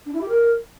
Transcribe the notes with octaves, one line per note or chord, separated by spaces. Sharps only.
D4
E4
G4
A#4